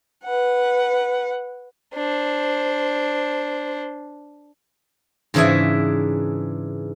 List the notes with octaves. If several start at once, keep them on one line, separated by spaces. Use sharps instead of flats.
B4 F#5
D4 C5
G#2 C#3 E3 D4 G#4 E5